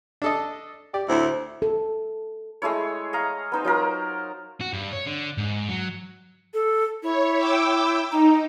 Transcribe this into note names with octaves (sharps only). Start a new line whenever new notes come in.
D4 A4 D#5
G4 D5
D2 A2 C4 E4
A4
G#3 A3 E4 C#5
D#5 F5 A#5
B3 D#4 C5
F#3 F4 A#4
F#4
G2
C#5
D3
G#2
F#3
A4
E4 C#5
G5 D6 E6
D#4 A#5